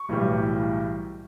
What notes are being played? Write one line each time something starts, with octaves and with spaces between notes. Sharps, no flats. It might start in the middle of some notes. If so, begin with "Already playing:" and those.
Already playing: C#6
B1 A2 E3 G3